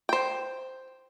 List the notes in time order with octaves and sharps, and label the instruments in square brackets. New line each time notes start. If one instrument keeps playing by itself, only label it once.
[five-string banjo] C5 G5